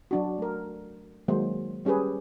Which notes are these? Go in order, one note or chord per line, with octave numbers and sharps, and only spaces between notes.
F#3 D4 F#4
A3 A#4
D#3 F#3 G#3 A#3 C5
G3 C#4 G4 G#4 B4